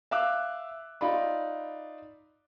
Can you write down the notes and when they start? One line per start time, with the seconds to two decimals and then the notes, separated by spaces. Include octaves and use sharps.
0.11 E5 F5 D6 E6 F#6
1.01 D#4 F4 D5 B5